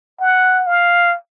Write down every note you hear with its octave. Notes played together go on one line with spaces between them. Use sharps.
F#5
F5